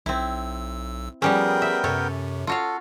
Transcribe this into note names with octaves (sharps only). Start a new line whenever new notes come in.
B1 C4 E4 E6
F3 G3 B3 C#4 G#4 A#4 G5
E5
F#2 C3 A4 C#5
F4 F#4 A4 F5